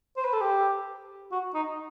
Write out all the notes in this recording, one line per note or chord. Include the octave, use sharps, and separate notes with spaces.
C5
B4
A4
G4
F#4
D#4